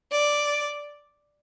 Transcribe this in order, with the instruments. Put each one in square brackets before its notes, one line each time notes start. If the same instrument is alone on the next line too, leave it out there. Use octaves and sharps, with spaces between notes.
[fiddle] D5